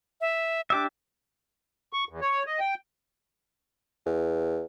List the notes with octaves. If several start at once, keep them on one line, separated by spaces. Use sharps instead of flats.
E5
D4 G4 E5 D6
C#6
E2
C#5
D#5
G5
E2